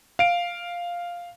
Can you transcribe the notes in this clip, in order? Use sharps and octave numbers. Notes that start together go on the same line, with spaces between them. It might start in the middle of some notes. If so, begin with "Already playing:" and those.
F5 D7